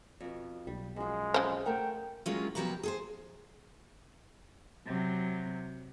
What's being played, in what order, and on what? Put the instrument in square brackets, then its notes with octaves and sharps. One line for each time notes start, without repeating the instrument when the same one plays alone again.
[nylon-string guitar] F2 B2
[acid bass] B1 [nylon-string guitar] G3
[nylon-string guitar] F#2 F3 [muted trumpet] G#3
[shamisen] C#3 C5
[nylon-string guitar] A3 A#4 F#5 [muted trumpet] G5
[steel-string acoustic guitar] F#3 G#3 A#3 C#4 F4
B2 F3 F#3 G4 A#4 B4
G#4 A4 C5
[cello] C3 F#3